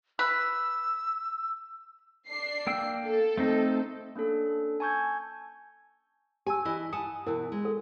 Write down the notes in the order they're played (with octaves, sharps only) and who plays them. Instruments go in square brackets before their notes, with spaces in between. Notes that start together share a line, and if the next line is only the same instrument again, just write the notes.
[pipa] B4 [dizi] E6
[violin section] D4 C7
[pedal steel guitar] A#3 G5 E6
[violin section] A4
[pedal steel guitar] A3 C4 D#4
[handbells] A#3 C#4 D4 A4
G#5 A5 C#6 E6 G6 G#6
[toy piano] G4 A5 E6 [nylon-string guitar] G#5
[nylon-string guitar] E3 E4 D#5
[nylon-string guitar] F#5 G#5 A5 [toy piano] D#6
[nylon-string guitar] B2 E3 [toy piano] E4 A#4
[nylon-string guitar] G#3
[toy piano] A4